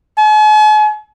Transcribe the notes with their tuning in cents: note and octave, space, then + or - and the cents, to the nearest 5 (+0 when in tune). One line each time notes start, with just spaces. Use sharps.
G#5 +45